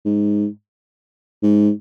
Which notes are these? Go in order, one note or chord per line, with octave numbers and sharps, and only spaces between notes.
G#2
G#2